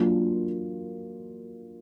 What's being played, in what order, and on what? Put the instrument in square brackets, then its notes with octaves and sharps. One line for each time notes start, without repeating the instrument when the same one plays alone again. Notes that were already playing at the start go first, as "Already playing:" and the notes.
Already playing: [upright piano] F#3 A#3 D4 F4